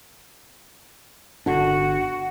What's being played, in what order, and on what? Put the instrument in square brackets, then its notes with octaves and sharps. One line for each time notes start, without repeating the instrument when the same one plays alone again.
[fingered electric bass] G1 D3 D4 [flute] F#4